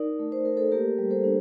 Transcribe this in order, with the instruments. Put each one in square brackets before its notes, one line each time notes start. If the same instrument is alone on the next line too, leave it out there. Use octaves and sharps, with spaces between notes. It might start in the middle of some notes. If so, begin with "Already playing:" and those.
Already playing: [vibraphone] D#4 A#4 D5
A3
C5
A3 A#4
A4 C5
A#3 G4 A#4
G3
A4 C5
D4